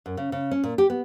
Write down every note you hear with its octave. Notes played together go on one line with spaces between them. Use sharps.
F#2
C#3
C#3
C#4
A#2
G4
B3